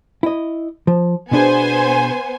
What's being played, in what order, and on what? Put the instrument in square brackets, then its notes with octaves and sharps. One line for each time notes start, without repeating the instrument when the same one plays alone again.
[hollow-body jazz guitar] E4 D#5
F3
[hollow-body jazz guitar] B2 D4 G#4 [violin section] B3 C5 G#5